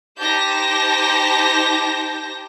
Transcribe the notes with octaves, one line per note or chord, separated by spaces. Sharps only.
D#4 G4 C5 A5 G6 A#6